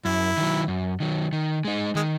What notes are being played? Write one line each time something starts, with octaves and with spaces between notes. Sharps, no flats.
F#2 E4
D#3 F#3
F#2
D#3 F#3
D#3
G#3 D#4
D#3 G#3